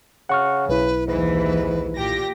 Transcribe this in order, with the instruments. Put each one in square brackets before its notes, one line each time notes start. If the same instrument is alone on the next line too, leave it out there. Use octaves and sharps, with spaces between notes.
[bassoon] C#3 [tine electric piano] F#5 C#6 F6
[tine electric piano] B1 E4 [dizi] B4
[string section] D#2 E3 [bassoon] G#2 [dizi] B4
[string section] A#2 G4 A#6